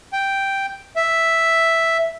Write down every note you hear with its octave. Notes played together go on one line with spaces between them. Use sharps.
G5
E5